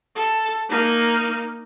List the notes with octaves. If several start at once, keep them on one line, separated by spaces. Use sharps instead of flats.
A4
A#3 D#4